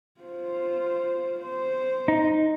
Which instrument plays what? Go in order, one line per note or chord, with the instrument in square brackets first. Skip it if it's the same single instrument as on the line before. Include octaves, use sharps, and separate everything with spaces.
[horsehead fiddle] F4 C5
C5
[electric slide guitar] D#4